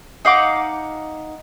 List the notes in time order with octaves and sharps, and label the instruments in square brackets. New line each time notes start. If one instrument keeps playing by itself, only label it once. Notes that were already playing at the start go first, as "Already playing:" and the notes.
[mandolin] D#4 F5 F#5 D6